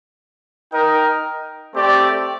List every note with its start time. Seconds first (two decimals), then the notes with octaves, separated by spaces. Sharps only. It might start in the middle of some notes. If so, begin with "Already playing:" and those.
0.71 D#4 A#4 D#5 G5
1.73 A3 C4 G4 D5